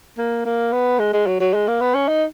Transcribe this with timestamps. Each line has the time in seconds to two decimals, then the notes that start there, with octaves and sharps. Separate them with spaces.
0.18 A#3
0.45 A#3
0.72 B3
0.99 G#3
1.13 G#3
1.27 F#3
1.40 F#3
1.54 G#3
1.68 A#3
1.81 B3
1.94 C#4
2.08 D#4